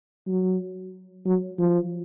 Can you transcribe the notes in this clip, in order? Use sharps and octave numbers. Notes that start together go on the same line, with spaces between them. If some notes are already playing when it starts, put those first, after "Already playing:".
F#3
F#3
F3